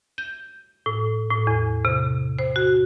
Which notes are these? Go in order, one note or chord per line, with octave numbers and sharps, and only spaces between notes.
G6
A2
A2
E2
C3
C5
F#4